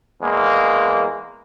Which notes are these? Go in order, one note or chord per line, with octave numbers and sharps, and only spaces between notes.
E2 G#3 A#3